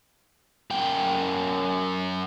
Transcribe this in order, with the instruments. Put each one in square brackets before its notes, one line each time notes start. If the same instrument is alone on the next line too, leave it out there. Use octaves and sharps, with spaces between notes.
[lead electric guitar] F#2 G5